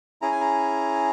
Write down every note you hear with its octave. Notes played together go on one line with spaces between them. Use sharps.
C#4 E4 G#4 A#5
G#5
A#5